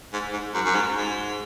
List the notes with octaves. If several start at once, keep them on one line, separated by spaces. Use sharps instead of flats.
G#2
G#2
F#2
F#2
G#2
G#2